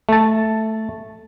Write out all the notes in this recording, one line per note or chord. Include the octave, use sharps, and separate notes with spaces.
A3 A5